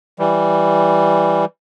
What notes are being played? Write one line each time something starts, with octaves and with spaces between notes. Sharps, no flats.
E3 G3